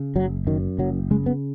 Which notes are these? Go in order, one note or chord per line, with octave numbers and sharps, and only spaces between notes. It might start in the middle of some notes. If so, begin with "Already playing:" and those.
Already playing: C#3
F#1 F#3
F#2 D#3
F#1 F#3
C#3 G#3
B3